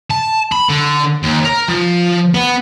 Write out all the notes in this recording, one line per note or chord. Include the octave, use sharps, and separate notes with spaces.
A5
B5
D3
D#2
A#4
F3
B3